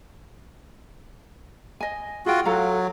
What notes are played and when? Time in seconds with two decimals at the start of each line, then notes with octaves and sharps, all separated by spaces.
1.81 D#5 G#5
2.26 F4 F#4 G#4 G5
2.45 F#3 A4 F5 A#5